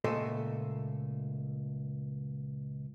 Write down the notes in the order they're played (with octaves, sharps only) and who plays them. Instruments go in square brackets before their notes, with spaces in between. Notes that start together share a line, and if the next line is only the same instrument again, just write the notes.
[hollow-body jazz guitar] C#2 A#2 A3 A4 C5 D#5